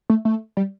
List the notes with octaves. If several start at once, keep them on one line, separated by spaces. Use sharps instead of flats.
A3
A3
G3